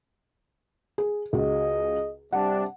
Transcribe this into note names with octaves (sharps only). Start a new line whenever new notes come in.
G#4
C#2 F#4 G#4 D#5
C3 G3 D4 F#5